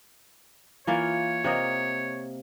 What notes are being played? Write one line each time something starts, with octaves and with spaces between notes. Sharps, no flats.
E3 A#3 F4 C#5
C3 A#3 D#5